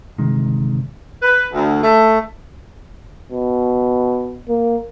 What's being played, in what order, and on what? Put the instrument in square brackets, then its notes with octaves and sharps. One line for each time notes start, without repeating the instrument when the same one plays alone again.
[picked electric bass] G1 C3 D#3 G#3
[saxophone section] B4
D2
A3
[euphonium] B2
A#3